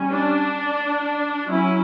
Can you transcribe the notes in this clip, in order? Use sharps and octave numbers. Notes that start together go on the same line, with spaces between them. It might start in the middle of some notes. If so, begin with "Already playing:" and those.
Already playing: G3 C#4
D4
F#3 C#4 E4